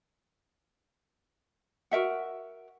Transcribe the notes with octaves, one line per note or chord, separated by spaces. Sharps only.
F#4 A#4 E5 F#5